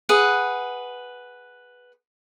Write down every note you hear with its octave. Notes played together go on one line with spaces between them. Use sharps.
G#4 B4 F#5